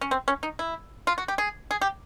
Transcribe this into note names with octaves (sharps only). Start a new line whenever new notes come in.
C#4
C4
C#4
D#4
E4
F4
F#4
G4
G#4
G#4
G4